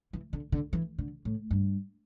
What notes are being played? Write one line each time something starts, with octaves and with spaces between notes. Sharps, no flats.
E3
D3
D3
E3
D3
A2
G2